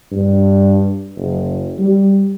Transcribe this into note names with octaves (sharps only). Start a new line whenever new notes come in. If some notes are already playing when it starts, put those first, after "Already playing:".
G2
F#1
G3